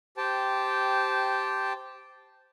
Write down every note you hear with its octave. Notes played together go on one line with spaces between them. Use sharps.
G4 C5 G5 A5